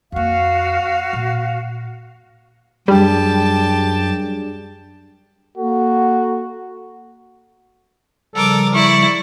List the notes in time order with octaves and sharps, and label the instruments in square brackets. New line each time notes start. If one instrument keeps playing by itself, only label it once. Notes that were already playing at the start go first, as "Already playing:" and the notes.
[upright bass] F2 A#3 [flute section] F#4 F5
[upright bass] A#2
[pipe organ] F#2 [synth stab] G3 [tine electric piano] D4 G#4 [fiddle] G4 A5
[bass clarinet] A#3 [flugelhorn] F#4 [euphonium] A4
[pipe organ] C#3 F3 G3 [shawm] A4 [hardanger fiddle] A#4 D6
[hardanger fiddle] E4 D5 [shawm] C#6